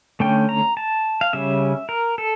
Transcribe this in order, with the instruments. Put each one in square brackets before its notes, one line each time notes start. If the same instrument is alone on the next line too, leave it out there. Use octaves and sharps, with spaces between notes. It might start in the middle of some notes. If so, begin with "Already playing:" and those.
[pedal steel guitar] D3 A3 C#4 G5
A#5
A5
F5
C#3 G3 C#4 E5
A#4
A4